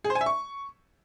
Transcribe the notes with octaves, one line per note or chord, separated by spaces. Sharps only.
G#4
C5
G#5
E5
C#6